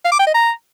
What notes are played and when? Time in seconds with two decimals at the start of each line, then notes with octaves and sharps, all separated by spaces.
0.04 F5
0.12 D6
0.19 G5
0.27 D#5
0.34 A#5